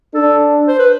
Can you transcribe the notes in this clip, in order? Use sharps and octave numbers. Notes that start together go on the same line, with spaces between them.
D4 A4
C5
B4